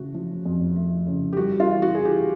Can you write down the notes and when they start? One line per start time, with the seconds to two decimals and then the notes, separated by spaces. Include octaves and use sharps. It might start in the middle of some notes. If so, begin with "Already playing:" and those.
Already playing: C#3 A3 F#4
0.14 F3
0.46 F2
0.76 A3
1.07 C#3
1.33 G4
1.36 G3 F#4
1.60 F4
1.67 E3
1.82 F#4
1.95 E3 G#4
2.05 G4